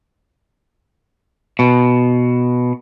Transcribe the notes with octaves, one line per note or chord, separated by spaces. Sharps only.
B2